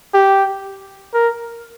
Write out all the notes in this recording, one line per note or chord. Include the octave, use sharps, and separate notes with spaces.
G4
A#4